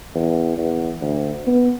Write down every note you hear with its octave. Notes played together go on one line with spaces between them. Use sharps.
E2
E2
D2
B3